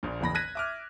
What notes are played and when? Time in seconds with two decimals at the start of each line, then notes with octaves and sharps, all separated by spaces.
0.03 A#1 A#2
0.21 F#1 E2 B5 A#6
0.35 F#6 G#6 A#6 B6 D#7
0.55 E5 D6 F6